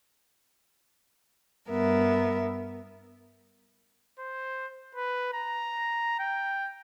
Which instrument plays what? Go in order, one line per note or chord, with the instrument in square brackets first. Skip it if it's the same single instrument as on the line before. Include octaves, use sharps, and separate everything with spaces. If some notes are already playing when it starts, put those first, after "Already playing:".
[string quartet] G2 B3 A#4 E5
[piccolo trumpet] C5
B4
A#5
G5